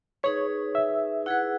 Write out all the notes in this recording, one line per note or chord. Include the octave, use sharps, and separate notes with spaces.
D#4 G#4 B4 C#5
E5
E4 G#4 B4 F#5